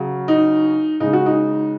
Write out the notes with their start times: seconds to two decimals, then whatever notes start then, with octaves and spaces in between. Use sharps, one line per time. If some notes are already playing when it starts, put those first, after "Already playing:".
Already playing: C#3 F#3
0.28 D#4
1.00 C#3 G#3 D#4
1.13 F#4
1.26 D#4